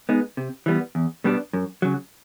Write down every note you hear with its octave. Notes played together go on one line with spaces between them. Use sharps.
G#3 B3 D#4
C3
E3 G3 B3
E2
B2 G3 B3 D4
F#2
C#3 F#3